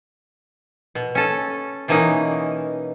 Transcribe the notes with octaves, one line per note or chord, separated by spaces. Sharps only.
B2
C#4 A4
B2 E3 A#3 C#4 D#4